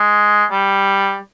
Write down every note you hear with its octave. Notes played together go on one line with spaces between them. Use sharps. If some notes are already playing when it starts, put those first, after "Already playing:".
Already playing: G#3
G3